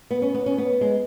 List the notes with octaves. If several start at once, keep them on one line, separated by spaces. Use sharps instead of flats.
B3
C#4
B3
C#4
B3
G#3